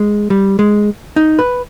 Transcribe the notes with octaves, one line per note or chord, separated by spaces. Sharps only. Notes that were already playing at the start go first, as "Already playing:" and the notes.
Already playing: G#3
G3
G#3
D#4
B4